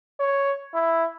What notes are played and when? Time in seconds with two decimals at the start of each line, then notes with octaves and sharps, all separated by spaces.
0.20 C#5
0.74 E4